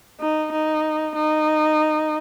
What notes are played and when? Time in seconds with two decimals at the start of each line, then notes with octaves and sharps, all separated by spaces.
0.20 D#4
0.52 D#4
1.15 D#4